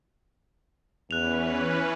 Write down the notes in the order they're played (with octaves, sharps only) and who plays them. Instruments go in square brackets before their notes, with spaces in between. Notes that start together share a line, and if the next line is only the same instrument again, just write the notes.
[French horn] E2 [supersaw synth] E3 C#4 B4 [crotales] F#6 F7